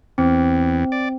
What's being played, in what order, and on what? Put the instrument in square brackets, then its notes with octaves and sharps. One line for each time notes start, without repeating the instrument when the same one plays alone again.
[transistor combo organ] E2 [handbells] C4
[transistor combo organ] D5